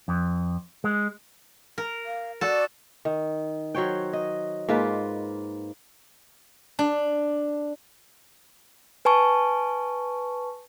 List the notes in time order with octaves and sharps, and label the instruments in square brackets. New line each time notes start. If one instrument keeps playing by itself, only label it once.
[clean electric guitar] F2
G#3
[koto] A#4
[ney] F5
[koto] F#4 A4 [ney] D5
[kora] D#3
F#3 C5 C#5 G5
D#5
G#2 A#3 F4 B4
[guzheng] D4
[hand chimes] B4 G#5 A5 C#6